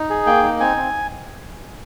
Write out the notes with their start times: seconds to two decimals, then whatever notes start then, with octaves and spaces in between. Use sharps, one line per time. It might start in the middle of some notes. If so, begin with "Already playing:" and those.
Already playing: D#4
0.10 G#4
0.26 A#3 G5
0.43 D#4
0.60 C4 G#5
0.77 C4